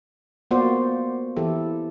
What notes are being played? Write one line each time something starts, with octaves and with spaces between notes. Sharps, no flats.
A#3 B3 F4 F#4 C5 D5
E3 E4 G4 A4